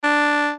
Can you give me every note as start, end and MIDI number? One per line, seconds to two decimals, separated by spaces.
0.04 0.50 62